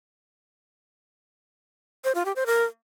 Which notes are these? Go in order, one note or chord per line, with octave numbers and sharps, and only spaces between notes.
C5
F4
G4
C5
A#4